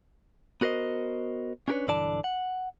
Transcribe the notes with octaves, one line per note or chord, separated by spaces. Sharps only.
B3 F#4 A#4 C5 D#5
C#4 D4 G4 A#4 B4 C#5
B1 G2 D3 E3 D5 A5
F#5